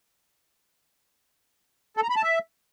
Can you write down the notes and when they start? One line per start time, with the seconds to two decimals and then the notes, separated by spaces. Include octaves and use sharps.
1.97 A4
2.03 A#5
2.10 B5
2.16 A5
2.22 E5